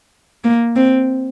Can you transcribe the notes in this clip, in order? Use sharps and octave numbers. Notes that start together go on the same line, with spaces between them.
A#3
C4